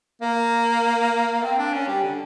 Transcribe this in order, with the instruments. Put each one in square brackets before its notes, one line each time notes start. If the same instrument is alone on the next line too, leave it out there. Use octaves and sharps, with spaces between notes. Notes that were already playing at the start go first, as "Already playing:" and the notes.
[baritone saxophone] A#3
C4
D4
C#4
G3
D3